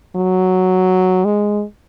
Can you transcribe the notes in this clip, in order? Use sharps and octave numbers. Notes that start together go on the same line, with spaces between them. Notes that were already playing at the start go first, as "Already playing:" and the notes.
F#3
G#3